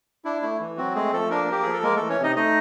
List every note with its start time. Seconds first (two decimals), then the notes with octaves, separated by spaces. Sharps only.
0.25 D4 E4
0.42 A3 E4
0.60 E3
0.77 F#3 C4 F#4
0.95 G#3 A3 G#4
1.13 F3 A3 A4
1.30 A#3 D4 A#4
1.48 A#3 G4
1.63 F3 G#4
1.73 A4
1.83 G#3 A#3 A#4
1.96 E3 A3 A4
2.10 C#4 C#5
2.19 C3 D#4 D#5
2.36 A3 D#4 D#5